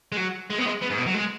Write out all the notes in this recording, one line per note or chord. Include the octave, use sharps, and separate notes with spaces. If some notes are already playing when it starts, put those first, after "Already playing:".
G#3
F#3
G#3
B3
G#3
B3
G#2
B2
F#3
G#3